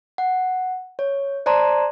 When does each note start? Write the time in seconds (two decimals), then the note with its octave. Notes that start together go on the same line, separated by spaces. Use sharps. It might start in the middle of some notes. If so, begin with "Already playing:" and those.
0.18 F#5
0.99 C#5
1.46 C5 D5 A5 A#5 C6